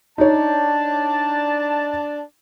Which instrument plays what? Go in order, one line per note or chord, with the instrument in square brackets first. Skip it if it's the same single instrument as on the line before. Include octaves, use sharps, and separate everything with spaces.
[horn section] D4 A5 [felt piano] D#4 C#5